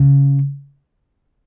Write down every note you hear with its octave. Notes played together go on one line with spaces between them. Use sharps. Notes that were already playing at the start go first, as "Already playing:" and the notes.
Already playing: C#3